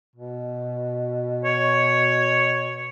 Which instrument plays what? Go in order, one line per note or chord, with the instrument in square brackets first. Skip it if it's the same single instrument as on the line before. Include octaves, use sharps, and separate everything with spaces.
[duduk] B2
[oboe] C#5